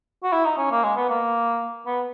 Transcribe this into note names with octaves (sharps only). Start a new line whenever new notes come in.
F#4
E4
D#4
C#4
A#3
G#3
B3
A#3
B3